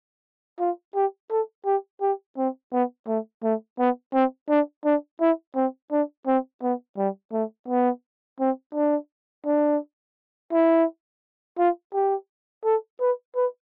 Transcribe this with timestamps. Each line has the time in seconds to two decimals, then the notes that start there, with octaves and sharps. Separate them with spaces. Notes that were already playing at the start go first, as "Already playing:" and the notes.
0.60 F4
0.95 G4
1.30 A4
1.66 G4
2.01 G4
2.37 C4
2.73 B3
3.08 A3
3.43 A3
3.79 B3
4.14 C4
4.50 D4
4.85 D4
5.20 E4
5.56 C4
5.91 D4
6.27 C4
6.63 B3
6.98 G3
7.33 A3
7.68 B3
8.40 C4
8.75 D4
9.46 D4
10.52 E4
11.59 F4
11.94 G4
12.65 A4
13.01 B4
13.36 B4